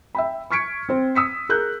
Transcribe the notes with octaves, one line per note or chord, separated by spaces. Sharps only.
E5 G5 B5
C#6 F6 G#6 B6 C#7 D7
C4 C5
D#6 E6 B6 C#7
G#4 A#4 F#6 G6